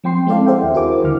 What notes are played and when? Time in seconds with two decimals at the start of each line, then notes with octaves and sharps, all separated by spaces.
0.04 F3 C4 G5 C6 C7
0.27 G#3 C4 E4 A4 D5 F5
0.46 G#4 C5 D5 E5 F#5 G5
0.63 D#2
0.74 E4 F#4 A#4 C5 G#5 D6
1.03 D#2 D3 F6